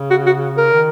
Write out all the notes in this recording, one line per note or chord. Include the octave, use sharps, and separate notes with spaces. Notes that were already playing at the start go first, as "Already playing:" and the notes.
Already playing: C#3
F#4
F#4
A#4
D#3